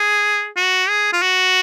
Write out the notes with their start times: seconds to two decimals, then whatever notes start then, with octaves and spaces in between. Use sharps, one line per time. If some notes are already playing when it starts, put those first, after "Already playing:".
Already playing: G#4
0.57 F#4
0.89 G#4
1.13 F4
1.22 F#4